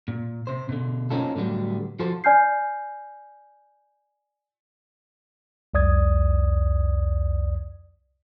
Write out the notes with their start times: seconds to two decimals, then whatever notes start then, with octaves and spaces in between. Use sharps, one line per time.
0.08 A#2
0.47 C3 C5
0.69 B2 D3
1.10 A#3 C4 C#4 D#4 F4 A4
1.36 A2 D3 F#3 G3 B3
1.99 F3 F#4 A4 C5
2.24 D5 G#5 F6 G6 C7
5.74 C2 F2 D5 D#6 G#6